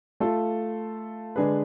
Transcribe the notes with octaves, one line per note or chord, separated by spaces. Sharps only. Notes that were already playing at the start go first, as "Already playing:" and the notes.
A3 F4 A4
D3 G#3 D4 G#4 B4